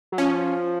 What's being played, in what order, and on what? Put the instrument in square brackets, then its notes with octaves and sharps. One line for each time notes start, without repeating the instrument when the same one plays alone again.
[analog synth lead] F#3
[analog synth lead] F3 [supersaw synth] C#4